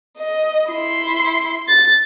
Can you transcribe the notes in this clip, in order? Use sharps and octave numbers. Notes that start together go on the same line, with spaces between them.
D#5
E4 C6
A6